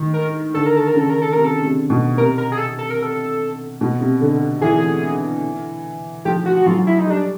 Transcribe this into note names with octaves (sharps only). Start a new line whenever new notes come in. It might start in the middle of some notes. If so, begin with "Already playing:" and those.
Already playing: D#3
A#4
D3 A4
A#4
A4
A#4
C#3 A4
A#4
A4
C3 A#4
A4
C3
B2
C3 A#4
A#4
G#4
A4
A4
A#4
A4
B2
C3
D3
E3 G#4
F3 G4
F#4
F#4
F#3 F4
E4
D#4
G3 D4